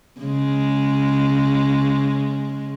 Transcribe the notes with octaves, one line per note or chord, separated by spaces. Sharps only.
C#3 G#3